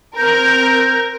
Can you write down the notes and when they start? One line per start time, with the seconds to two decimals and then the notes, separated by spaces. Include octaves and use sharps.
0.17 C4 A#4 G6